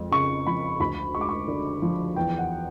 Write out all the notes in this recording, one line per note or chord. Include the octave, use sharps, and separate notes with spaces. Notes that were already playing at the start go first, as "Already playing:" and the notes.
Already playing: F2 G#3
C#3 C#6
F3 B5
D2 B5
G#3 C#6
D6
C#6
D3
F3
E2 G5
F#5